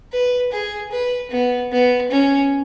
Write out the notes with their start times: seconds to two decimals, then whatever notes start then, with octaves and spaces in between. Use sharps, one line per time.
0.12 B4
0.52 G#4
0.92 B4
1.31 B3
1.72 B3
2.11 C#4